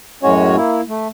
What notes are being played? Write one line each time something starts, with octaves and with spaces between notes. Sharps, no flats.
F#2 A2 G#3 C#4 F#4 C#5
A#3 E4
A3